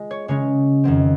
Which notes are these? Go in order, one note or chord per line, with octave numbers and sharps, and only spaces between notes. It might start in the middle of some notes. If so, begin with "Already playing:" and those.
Already playing: G#3 F4
C#5
C#3 G#3 C#4 C#5
F2 D#3 F#3 C4